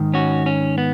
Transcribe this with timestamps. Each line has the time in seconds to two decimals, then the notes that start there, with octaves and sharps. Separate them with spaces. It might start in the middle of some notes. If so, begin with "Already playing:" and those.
Already playing: G#2 D#3
0.14 C#4 F#4
0.46 C#4
0.78 B3